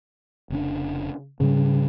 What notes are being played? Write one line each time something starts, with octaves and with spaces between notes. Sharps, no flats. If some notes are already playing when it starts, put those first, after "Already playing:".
F1 C#3 D4
G#2 C#3 G3